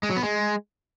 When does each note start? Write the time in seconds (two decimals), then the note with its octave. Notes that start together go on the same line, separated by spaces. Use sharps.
0.03 G#3
0.10 F#3
0.16 B3
0.23 G#3